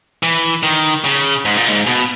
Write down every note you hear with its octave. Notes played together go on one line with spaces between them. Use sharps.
E3
D#3
C#3
G#2
A#2
G#2
B2